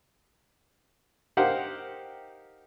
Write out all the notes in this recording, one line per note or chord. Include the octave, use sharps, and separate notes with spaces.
D#4 G4 A#4 C5 F5 F#5